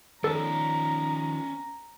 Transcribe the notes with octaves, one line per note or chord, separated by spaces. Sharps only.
D#3 F3 C#4 A4 D5 A#5